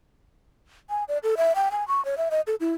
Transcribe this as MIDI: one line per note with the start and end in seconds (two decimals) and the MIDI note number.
0.90 1.04 80
1.08 1.18 74
1.23 1.35 69
1.37 1.55 76
1.55 1.69 79
1.71 1.86 80
1.88 2.03 85
2.05 2.18 73
2.18 2.29 76
2.31 2.41 75
2.47 2.55 69
2.60 2.74 64